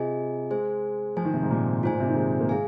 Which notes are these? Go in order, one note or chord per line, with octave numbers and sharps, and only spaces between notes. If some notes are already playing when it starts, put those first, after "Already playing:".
Already playing: C3 F4 G#4 D#5 G#5
G#3 G#4 C5 G#5
F3 F4 C5 G#5
D#3
C3
G#2
A#2
G#2 F4 C5 G#5
A#2
C3
D#3
G#3
A#3
G#3 G#4 F5 G#5